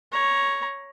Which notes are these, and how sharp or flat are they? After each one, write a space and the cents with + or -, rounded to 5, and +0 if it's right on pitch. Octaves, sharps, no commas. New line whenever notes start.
C#5 +0 A#5 +15